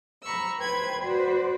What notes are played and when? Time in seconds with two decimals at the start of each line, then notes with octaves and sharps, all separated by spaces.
0.23 A#5 B5 C#6 E6
0.59 B4 C5 G5 B5 G#6
1.01 F#4 B4 C5 D5